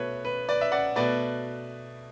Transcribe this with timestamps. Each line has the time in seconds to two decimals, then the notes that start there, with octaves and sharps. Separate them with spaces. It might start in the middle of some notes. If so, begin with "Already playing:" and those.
Already playing: B2 A3 B4 C#5
0.25 B4
0.49 B4 D5
0.61 E5
0.72 D5 F#5
0.96 B2 A3 B4 D5